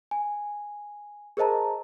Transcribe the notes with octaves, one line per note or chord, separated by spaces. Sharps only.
G#5
G#4 A#4 C5 D#5 A5 A#5